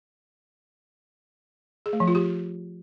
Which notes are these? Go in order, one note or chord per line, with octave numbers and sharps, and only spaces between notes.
G#4
A3
F3
F4
G4